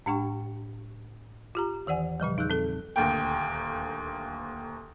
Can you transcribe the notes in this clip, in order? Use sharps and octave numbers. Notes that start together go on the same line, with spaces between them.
A2 G#3 D4 G4 G5 C#6
F4 G4 A#5
E2 D#3 E3 D5 F#5 G#5
A#2 C#3 F3 G3
E2 D#4 G#4 E6 F#6 G6
C4 A4
D#1 D2 A#3 G5